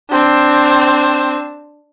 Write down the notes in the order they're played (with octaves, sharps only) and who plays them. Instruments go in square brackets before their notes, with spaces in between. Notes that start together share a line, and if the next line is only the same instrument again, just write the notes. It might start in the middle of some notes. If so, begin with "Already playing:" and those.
[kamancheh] C4 D4